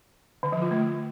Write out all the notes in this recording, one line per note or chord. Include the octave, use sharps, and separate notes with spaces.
D3
F3
F4
A3